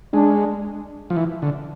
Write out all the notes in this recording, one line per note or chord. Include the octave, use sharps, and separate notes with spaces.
G#3 D4
F3
E3
D3